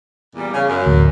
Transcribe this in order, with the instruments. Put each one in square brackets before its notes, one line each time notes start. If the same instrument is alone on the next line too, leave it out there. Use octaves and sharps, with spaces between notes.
[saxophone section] E2 A#2 G3
C#3
F#2
[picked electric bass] A1 D2